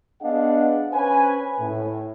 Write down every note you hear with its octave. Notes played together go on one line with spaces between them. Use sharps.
B3 D4 G#4 D#5 F5 F#5
C#4 B4 C5 G#5
A2